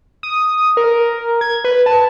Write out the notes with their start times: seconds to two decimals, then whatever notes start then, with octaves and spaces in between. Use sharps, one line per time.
0.23 D#6
0.77 A#4
1.41 G#6
1.65 B4
1.86 A5